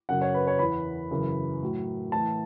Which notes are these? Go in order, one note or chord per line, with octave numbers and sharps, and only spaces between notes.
F#2 C#3 F#3 F#5
C#5
B4
C#5
E2 E3 B5
F#2 C#3 E3
A2 F#3
A2 E3 A5